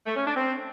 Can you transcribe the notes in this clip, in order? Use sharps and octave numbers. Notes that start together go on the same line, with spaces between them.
A3
C#4
D4
C4